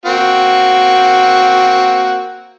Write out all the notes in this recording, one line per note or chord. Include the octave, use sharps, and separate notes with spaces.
A#3 C4 F#4